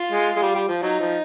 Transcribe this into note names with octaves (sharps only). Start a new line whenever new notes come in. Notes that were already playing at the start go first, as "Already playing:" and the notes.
Already playing: F4
G#3
G#3
G3
G3
F3
F#3 D#4
F3